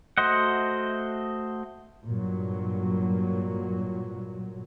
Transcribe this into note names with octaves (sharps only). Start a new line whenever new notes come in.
A3 F#4 C5 D#5 F#5
G2 A#2 F#3